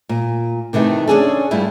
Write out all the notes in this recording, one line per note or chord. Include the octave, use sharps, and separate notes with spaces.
A#2
C3 D#3 E3 A3
C#4 D4 G#4 A4
G2 G3 A3 E4 F4